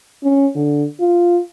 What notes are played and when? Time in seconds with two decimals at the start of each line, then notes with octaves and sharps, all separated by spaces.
0.24 C#4
0.55 D3
1.00 F4